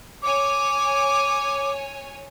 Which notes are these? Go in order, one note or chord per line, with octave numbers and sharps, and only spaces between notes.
C#5 G#5 D6